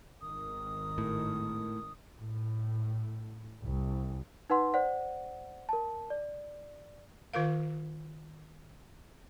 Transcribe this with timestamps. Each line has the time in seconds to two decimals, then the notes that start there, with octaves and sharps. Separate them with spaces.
0.21 G#1 D#3 D#6
0.98 A2
2.17 A2
3.63 C2
4.50 D#4 B4 F#5 C6
4.74 C5 D5 F#5
5.69 A#4 A5
6.10 D5
7.34 D#3 F4 A#4 F5